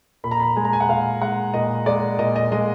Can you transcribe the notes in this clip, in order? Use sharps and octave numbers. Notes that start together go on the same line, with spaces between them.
A#2 B5
A#5
B5
G#3 G#5
A#5
G#5
F#5
A#2 F5
G#3 F#5
A#2 D#5
G#3 D5
A#2 D#5
D#5
G#3 D#5